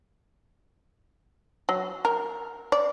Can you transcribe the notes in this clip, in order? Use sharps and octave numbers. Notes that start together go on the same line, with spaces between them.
F#3
A#4
D5